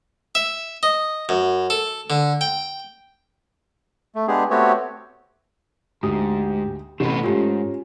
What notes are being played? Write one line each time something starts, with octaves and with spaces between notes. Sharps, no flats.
E5
D#5
F#2
A4
D3
G5
A3
G#3 B3 D4 G4 G#4
A3 B3 C4 F#4 G4 C#5
D2 G#2 G4 D#6
A1 C3 A3 B3 B5
E2 G#2 C#4 F4 G4